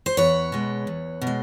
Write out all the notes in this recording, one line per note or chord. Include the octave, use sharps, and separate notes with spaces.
C5
E2 B4 C#5
B2 G#3
E2
B2
G#3